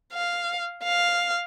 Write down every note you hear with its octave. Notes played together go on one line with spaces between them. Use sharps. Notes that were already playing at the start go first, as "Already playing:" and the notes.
F5
F5